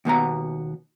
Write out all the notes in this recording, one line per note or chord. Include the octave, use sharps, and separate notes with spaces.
D#2 B2 B3 A#5